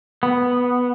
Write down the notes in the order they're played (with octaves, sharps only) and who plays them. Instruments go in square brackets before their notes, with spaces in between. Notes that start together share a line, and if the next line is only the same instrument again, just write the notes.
[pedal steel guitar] B3